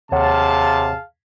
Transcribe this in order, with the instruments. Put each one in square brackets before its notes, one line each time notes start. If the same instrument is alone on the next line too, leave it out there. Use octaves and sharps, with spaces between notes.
[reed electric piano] D#2 C#5 F#5 [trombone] C3 [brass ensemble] G#4 F5 A5